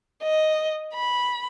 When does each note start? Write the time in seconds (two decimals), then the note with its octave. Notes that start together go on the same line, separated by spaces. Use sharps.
0.23 D#5
0.95 B5